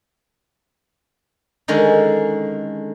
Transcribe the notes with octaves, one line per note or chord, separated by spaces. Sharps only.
D3 D#3 G#3 C#4